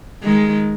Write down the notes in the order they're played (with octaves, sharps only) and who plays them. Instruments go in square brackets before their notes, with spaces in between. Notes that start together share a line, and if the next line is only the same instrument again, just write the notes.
[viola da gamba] D#3 G#3